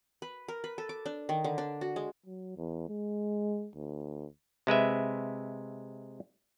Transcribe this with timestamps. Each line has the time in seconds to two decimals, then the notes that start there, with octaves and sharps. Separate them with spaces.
0.22 B4
0.48 A#4
0.64 B4
0.78 A4
0.89 D6
1.06 D4
1.29 D#3
1.44 D3
1.58 D4
1.81 F#4
1.96 G#3
2.26 F#3
2.57 E2
2.89 G#3
3.76 D2
4.67 C3 G#3 B4 E5